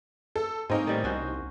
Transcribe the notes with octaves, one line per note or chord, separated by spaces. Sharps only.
A4
G#2 A#3 C4 C#4 D#4
A2 D#3 G3
C2 C#4 F#4 C5